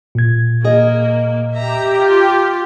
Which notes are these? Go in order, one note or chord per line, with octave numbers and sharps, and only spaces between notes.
A#2 G#6
A#3 G#4 D#5
G4 E5 A#5
F4